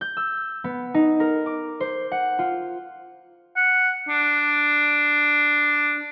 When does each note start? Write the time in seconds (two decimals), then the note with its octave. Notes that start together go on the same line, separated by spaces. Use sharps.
0.01 G6
0.17 E6
0.64 B3
0.94 D#4
1.20 A#4
1.46 D6
1.80 C5
2.12 F#5
2.39 F4
3.56 F#5
4.09 D4